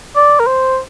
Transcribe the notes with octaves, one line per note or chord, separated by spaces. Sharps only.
D5
A#4
C5